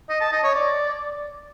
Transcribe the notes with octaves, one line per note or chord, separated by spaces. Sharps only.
D#5
A5
D#5
C#5
D5